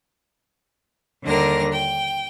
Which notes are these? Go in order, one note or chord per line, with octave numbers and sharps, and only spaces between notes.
D#2 D3 G3 D4 A#4 A#6
G5